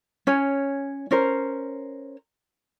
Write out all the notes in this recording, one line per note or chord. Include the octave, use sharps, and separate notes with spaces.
C#4 C#5 G#5
C#4 A#4 C5